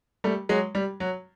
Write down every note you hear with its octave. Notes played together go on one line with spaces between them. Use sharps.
G3 A3
F#3 G#3
G3
F#3